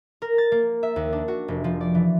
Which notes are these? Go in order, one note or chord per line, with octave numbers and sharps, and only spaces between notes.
A#4
A6
A#3
E5
D#2
D4
F#4
F1
F3
D5
E3